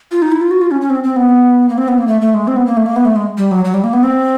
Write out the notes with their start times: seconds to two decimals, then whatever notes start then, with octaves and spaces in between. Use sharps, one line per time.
0.12 F4
0.22 D#4
0.32 E4
0.41 F4
0.51 F#4
0.61 F4
0.71 C#4
0.81 C#4
0.90 C4
1.03 C4
1.16 B3
1.69 A#3
1.78 C4
1.88 B3
1.98 A#3
2.07 A3
2.21 A3
2.34 G#3
2.47 C4
2.56 B3
2.66 A#3
2.77 A3
2.86 A#3
2.96 B3
3.05 A3
3.16 G#3
3.37 G3
3.51 F#3
3.65 F#3
3.74 G3
3.84 A#3
3.93 B3
4.03 C4